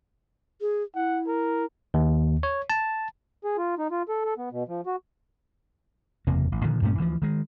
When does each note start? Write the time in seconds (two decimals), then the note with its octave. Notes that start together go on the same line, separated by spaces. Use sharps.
0.61 G#4
0.95 E4 F#5
1.27 A#4
1.94 D#2
2.43 C#5
2.70 A5
3.44 G#4
3.58 F4
3.79 D#4
3.91 F4
4.09 A4
4.25 A4
4.38 B3
4.52 B2
4.69 F3
4.86 F#4
6.27 F#1 E2 C3 A#3
6.52 A1
6.63 A#2 D3 D#3 F3
6.82 G2 A#2 A3 C#4
6.97 D2 E3 F3
7.22 D#3 G#3